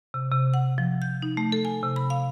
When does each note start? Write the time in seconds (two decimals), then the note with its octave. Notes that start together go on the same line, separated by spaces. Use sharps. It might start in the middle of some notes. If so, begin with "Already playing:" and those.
0.14 C3
0.32 C3
0.54 F#5
0.78 F3
1.02 G6
1.22 D#4
1.37 A3
1.52 A4
1.65 G#5
1.83 C3
1.96 B5
2.10 F5